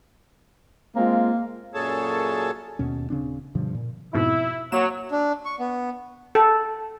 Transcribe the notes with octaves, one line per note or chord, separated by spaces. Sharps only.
G#3 A#3 C4 F4
F#2 A#2 G#4 A4 C#5 A5
D#2 B2 C#4
D#1 C#3 C4 D4
G2 B2 D3 F3
A#2
F2 G#2 B2 E4
F#3 A#3 E7
D4
C#6
B3
A4